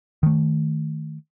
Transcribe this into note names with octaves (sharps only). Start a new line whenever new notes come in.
D#3 A3